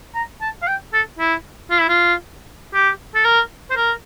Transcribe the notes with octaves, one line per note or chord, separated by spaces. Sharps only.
A#5
A5
F5
G5
A4
E4
F4
E4
F4
G4
A4
A#4
C5
A#4